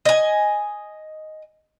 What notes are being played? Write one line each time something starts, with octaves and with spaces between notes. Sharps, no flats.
D#5 G#5